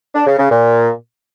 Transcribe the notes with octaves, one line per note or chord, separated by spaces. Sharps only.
D4
C#3
C#3
A#2